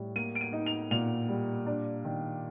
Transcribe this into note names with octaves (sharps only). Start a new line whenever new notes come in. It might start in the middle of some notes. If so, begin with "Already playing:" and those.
Already playing: A2 G3
A#3 D#7
D7
D#7
D#4
F7
A#2 F7
G3
D4
D#3